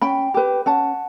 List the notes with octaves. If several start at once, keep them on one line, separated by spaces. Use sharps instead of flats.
C#4 G5 B5
G4 B4
C#4 F#5 A5